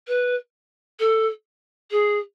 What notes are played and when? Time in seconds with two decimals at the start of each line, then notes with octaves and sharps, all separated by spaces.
0.08 B4
1.00 A4
1.91 G#4